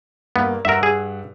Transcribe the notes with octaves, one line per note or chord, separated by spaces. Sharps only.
G2 A#3 B3
G2 A#4 E5 F#5 E6
G#4